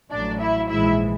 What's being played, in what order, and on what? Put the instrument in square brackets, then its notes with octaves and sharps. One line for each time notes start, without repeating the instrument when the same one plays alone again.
[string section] A1 A2 F#3 D4 D5
E4 E5
A#1 G#2 E3 G#3 E4 E5